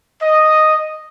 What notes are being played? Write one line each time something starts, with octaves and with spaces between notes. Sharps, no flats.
D#5